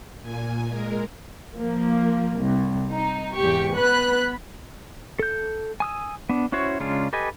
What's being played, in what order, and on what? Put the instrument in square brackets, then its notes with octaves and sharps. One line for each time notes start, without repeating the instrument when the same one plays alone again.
[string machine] A#2 G#5
G#3 A#4
[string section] F3 A#3
C2
D#4
E2 G#2 G4 C#6
B3 B4 B5 F#6
[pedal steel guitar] A4 G6
G#5 D#6 E6
B3 D4
C#4 E4 F#4 C5 C#5
C#3 G#3 C#4 D4 F4
G4 A4 B4 D#5 G#5